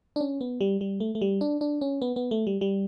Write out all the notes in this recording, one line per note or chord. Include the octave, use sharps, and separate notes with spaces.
D4
C#4
B3
G3
G3
A3
A3
G3
D4
D4
C#4
B3
B3
A3
G3
G3